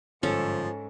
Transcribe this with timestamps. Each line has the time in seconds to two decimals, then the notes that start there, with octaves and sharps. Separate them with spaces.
0.23 G1 G#2 F3 C#4 A4